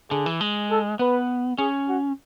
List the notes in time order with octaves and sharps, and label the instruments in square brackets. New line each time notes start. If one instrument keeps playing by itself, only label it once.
[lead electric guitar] D3 [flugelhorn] G#4
[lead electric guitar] E3
G#3
[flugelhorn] A4
[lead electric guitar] B3 [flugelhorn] B4
[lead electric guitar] C#4 [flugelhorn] G#4
[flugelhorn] F#4